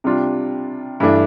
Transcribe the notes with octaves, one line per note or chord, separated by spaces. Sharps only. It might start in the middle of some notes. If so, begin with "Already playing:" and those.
C3 G3 D4 F4
G2 E3 A3 D4